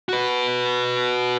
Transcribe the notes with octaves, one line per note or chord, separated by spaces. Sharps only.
F#4 B4